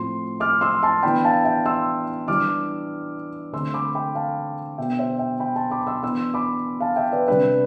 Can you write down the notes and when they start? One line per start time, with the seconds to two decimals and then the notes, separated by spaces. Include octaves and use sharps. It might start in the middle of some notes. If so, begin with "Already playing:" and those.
Already playing: A2 F3 C4 C6
0.40 D6 F6
0.61 C6 E6
0.83 A5 C6
1.03 E3 B3 D4 G5 B5
1.25 F5 A5
1.44 E5 G5
1.66 C6 E6
2.28 E3 G3 D4 D6 F6
3.53 D3 A3 C4 C6 E6
3.74 B5 D6
3.95 G5 B5
4.15 F5 A5
4.78 B2 B3 D4 E5 G5
4.99 C5 E5
5.19 E5 G5
5.40 G5 B5
5.56 A5 C6
5.71 B5 D6
5.87 C6 E6
6.03 E3 B3 D4 C6 E6
6.34 B5 D6
6.80 F5 A5
6.96 E5 G5
7.12 B4 D5
7.28 C3 G3 D4 B4